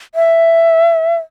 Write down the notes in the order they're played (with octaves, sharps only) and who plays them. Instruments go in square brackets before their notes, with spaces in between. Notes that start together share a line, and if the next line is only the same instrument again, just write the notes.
[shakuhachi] E5